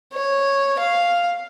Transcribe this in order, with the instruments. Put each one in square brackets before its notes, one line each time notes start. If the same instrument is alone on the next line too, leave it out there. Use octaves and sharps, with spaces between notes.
[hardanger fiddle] C#5
F5